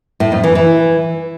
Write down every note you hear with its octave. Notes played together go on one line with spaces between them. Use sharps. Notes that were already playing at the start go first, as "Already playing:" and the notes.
A2
F2
E3
E3